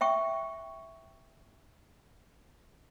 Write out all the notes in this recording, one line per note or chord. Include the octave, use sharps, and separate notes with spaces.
E5 G5 C#6